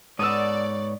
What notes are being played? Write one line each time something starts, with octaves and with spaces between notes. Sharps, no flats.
G#2 B3 A4 C#5 D5 D#6 E6